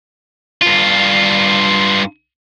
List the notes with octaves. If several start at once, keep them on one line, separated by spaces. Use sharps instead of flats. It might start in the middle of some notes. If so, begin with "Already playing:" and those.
G2 F4